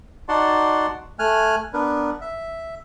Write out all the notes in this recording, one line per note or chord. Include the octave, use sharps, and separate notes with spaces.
D#4 F#4 D5 F#5 A5 C6
A3 G#5 F6 F#6
B3 D4 A#4 B4
E5